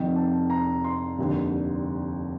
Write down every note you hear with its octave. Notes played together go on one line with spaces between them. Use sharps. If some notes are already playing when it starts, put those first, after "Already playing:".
Already playing: F1 F2 D#3 G5
A5
A#5
C6
F1 D#2 D3